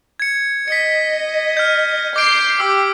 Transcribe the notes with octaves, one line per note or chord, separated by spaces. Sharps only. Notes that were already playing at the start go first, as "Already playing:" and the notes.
G#6 C#7
D#5 B6 C#7
F6 G6
D6 G6 C7 D7
G4 D6 E6